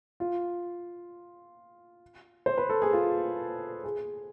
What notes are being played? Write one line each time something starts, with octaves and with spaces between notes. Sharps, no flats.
F4
C5
B4
A4
G#4
F4
G#4